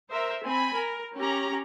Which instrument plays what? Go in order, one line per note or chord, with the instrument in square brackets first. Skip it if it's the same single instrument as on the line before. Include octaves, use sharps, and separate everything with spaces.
[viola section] A#4 C5 E5
C4 G#5 B5
A#4
C#4 G4 A#5